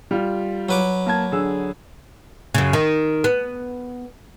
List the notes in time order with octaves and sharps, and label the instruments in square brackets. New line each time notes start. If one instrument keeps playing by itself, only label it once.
[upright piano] G3 F4
[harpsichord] F#3 B4 D6
[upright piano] A#3 A5 G#6
D3 G#4 E6
[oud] F#2 C#3
D#3
B3